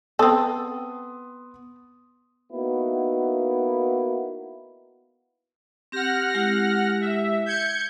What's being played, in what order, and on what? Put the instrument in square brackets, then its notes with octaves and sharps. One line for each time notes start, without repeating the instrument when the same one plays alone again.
[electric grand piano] B3 C6 D#6 [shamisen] C4 A4
[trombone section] A#3 B3 D#4 E4 F#4
[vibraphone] C4 G4 [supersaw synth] F#5 F6 A#6
[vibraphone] G#3 E4 G4
[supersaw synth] E5
G6 G#6 C#7